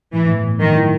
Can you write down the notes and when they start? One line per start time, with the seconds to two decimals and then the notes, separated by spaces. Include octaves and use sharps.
0.13 A2 E3
0.28 A2
0.44 A2
0.60 D#3 F#3
0.75 E4